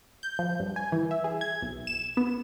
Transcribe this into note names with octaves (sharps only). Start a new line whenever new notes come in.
G6
F3
G2
G#5
E3
E5
G#4
G#6
B1
E7
B3